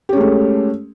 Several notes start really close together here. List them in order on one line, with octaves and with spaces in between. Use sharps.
G4 C#4 G#3 A3